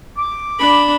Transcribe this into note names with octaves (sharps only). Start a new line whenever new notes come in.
D6
D4 B5